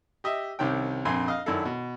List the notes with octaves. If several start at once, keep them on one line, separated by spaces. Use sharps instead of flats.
G4 D#5 E5
C2 C3 D#3 C#4 G5
A#1 F2 C4 G#5 C6
D#5 F5
F#2 D#3 D4 E4 A4
B2